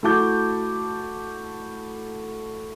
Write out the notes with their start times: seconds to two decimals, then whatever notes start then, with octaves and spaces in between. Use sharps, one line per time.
0.03 A3 E4 F#4 A5 D6 G6